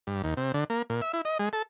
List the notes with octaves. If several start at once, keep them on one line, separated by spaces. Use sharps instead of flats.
G2
D#2
C3
D3
A#3
A#2
E5
E4
D#5
G#3
A4